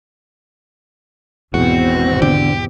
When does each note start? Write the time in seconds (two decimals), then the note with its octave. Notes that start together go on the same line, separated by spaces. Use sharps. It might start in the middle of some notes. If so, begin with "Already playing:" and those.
1.54 G#1 E2 B2 C4 F#4
2.22 D3 G4